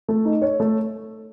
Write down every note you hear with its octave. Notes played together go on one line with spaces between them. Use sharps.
A3
D#4
C#5
A3